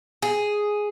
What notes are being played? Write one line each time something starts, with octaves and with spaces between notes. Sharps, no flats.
G#4